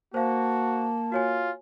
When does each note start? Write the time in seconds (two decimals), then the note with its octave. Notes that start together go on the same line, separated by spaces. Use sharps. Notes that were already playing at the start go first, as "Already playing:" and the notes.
0.14 A#3 F#4 C5 F5 A5
1.12 F4 F#4 C#5 G#5